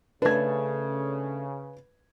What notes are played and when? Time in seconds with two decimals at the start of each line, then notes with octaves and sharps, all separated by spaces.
0.22 C#3 A3 D4 B4 G#6